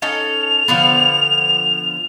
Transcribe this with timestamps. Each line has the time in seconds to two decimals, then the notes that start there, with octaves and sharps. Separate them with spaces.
0.02 C#4 D#4 A4 F7
0.68 D3 F3 B3